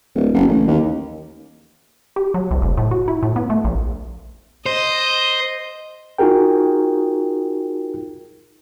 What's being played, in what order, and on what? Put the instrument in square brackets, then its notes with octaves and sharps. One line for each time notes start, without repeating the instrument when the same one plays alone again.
[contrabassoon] D1
F#1
A1
D#2
[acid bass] G4
F#3
C2
F1
A2
F#4
E4
A2
B3
A3
A#1
[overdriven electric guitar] C5 [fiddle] D#5
[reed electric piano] D#4 F4 F#4 G#4 A#4 G5